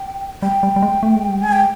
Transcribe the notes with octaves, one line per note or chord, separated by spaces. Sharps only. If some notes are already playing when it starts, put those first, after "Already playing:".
Already playing: G5
G3 G5
G3
G3
G#3
A3
G#3
G3
G#3 G#5
G5